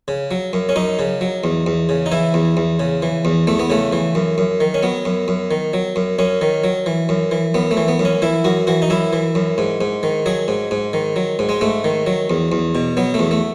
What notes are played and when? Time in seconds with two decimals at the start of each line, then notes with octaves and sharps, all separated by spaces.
0.08 C#3
0.31 F#3
0.53 F#2
0.69 C#4
0.76 F#2 D#4
0.99 C#3
1.21 F#3
1.44 E2
1.66 E2
1.89 C#3
2.06 D#4
2.12 E3 E4
2.34 E2
2.57 E2
2.80 C#3
3.02 E3
3.25 E2
3.47 E2 A3
3.59 B3
3.70 C#3 A3
3.93 E3
4.15 F#2
4.38 F#2
4.60 D#3
4.74 C#4
4.83 F#3 B3
5.05 F#2
5.28 F#2
5.51 D#3
5.73 F#3
5.96 F#2
6.19 F#2 C#4
6.41 D#3
6.64 F#3
6.86 E3
7.09 F#2
7.31 E3
7.54 F#2 B3
7.71 A3
7.77 E3
7.88 B3
7.99 F#2
8.05 C#4
8.22 E3 E4
8.44 F#2 F#4
8.67 E3 F#4
8.82 D#4
8.90 F#2 E4
9.13 E3
9.35 F#2
9.58 G#2
9.81 G#2
10.03 D#3
10.26 F#3 G#4
10.48 G#2
10.71 G#2
10.93 D#3
11.16 F#3
11.39 G#2
11.49 G#3
11.61 G#2 A3
11.84 D#3
12.06 F#3
12.30 E2
12.52 E2
12.75 B2
12.97 F#3 B3
13.14 A3
13.19 E2
13.31 A3